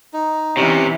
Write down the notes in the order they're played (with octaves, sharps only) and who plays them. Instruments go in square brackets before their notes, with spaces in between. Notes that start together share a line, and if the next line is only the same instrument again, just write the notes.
[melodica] D#4
[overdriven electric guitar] C3 [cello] E3 [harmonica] G3 B3 C#4